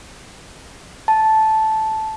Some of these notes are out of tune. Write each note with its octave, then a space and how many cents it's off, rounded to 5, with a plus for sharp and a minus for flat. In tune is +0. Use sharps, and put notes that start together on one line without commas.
A5 -10